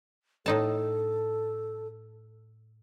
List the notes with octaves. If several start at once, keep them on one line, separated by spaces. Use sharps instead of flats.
A2 D#4 A4 A5